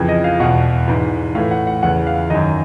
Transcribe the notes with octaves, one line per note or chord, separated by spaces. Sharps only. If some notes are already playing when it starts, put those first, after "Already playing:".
Already playing: F2 C#3 E3
D#5
F5
E2 B2 F#5
G#2 E3
A2 E3 F5
F#5
F#5
E2 C#3 E3 F#5
F5
F#2 D#3 D#5